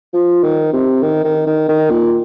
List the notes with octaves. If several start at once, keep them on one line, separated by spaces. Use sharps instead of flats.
F3
D#3
C3
D#3
D#3
D#3
D#3
A#2